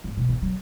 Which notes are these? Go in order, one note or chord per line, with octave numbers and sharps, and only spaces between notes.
G#2
B2
D#3
F#3